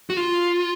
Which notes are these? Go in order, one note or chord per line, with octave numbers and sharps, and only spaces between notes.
F#4
F4